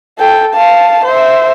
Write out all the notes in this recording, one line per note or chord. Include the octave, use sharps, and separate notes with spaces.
A4 G5
F5 A5
C5 E5